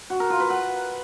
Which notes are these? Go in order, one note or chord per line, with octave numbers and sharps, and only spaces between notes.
F#4
A#4
F4
B4
F#5